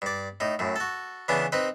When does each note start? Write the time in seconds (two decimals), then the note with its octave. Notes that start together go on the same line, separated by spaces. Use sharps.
0.02 G2 D5
0.40 A2 D#4
0.59 F#2 A2
0.76 F#4 A4
1.28 C#3 E3 B3 D4
1.52 C4 D#4 B4